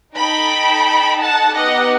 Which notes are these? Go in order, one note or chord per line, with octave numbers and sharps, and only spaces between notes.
D#4 A4 G5 B5
F#5 A5
B3 D#4 G4 D#5 F#5